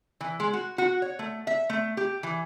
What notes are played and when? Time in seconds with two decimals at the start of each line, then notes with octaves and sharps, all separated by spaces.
0.21 E3
0.40 G#3
0.53 F#4
0.78 F#4
1.02 C#5
1.19 A3
1.47 E5
1.69 A3
1.97 G4
2.23 E3